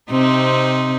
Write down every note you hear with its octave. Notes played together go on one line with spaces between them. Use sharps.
C3 C4 D#4